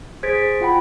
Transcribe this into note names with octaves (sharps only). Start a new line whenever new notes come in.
G#4 C5 G#6 A6 B6 D7
F4 F#5 G5 B5